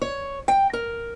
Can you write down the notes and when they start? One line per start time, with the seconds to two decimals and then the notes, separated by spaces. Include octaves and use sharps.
0.02 C#5
0.48 G5
0.73 A#4